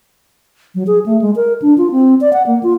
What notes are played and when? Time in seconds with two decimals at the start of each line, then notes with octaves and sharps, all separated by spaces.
0.75 F#3
0.87 G#4
1.06 A3
1.22 G#3
1.36 A#4
1.62 D4
1.78 F4
1.92 C4
2.21 D5
2.33 F#5
2.47 A#3
2.63 F4